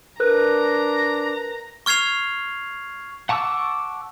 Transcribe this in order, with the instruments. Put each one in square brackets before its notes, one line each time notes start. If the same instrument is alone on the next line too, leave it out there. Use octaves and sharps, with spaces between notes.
[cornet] D4 [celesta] A#4 B4 F#6 [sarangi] A#5
[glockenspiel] C#6 F6 G#6 C7 F7
[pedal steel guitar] F#5 A5 C#6 D6 E6